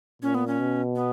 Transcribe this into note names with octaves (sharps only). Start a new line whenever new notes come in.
A#2 C#4
B3
C#4
B2
B3